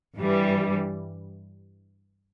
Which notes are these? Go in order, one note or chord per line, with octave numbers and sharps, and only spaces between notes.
G2 E3 G3